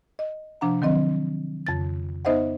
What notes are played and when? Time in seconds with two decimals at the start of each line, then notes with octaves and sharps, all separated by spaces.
0.19 D#5
0.61 C3 F3 D4 F#5 A#5
0.82 D#3 F#3 C4 D#5
1.67 F2 C#3 A6
2.25 B3 D#4 C5 D#5 E5 F#5